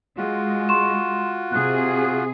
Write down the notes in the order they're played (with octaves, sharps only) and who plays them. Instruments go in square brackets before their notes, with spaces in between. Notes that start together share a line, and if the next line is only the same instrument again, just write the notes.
[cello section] G#3 [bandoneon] F4 F#4
[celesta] C6 C#6 E7
[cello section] C3 G#4 [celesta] F#6